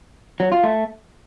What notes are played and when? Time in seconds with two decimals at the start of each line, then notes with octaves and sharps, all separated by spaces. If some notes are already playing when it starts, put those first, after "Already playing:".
0.40 F#3
0.52 F4
0.64 A3